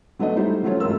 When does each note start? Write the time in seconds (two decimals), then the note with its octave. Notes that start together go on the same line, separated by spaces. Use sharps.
0.19 F#3 A3 B3 D4 D#5
0.36 G3 A3 D#4 E4 C5
0.63 E3 F#3 A3 C#4 F4 C#5
0.80 G#1 G#3 A3 F4 A#4 E6